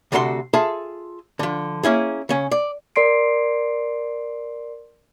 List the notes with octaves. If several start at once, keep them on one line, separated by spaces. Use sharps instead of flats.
D2 C3 F#4 A4 B4 C6
F4 G#4 A4 E5 A5
D3 F3
A#3 C#4 E4 G#4
C#3 C#4
D5
A#4 D5 C6 C7 D7